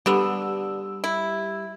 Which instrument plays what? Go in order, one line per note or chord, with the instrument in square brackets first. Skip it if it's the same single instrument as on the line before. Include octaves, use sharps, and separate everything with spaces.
[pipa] D3 B3 [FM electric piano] G3 G4 E6
[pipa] E4